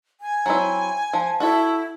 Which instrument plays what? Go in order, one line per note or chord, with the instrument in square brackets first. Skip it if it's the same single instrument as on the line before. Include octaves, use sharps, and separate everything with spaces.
[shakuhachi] G#5
[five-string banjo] F#3 C4 E4
F3
[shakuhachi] E4 [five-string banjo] F#4 A4 E5